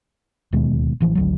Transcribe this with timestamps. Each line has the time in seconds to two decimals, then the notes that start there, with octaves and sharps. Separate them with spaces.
0.53 D1 D#2 B2 G#3
1.00 A1 E3 F3
1.15 G#1 D2 F#3